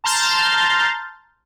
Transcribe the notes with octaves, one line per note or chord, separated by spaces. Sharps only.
A5 A#5 C6 F6 G6 A6